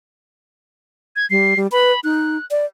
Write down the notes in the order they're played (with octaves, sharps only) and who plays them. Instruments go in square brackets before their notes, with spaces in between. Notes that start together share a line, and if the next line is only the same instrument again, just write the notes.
[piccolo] G#6
[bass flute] G3 [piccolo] C7
[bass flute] G3
[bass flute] B4 [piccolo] B5
[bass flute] D#4 [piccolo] F#6
[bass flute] D5